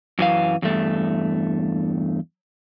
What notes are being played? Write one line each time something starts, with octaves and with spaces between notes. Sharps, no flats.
F#2 E3 F5
E2 G2 A3